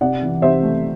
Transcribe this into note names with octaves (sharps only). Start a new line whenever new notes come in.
C3 D5 F#5
E3
C3 C5 E5
A3